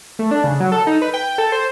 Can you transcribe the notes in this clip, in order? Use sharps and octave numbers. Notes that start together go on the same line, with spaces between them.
A3
D4
C#3
F#3
A4
D#4
B4
G5
A4
C5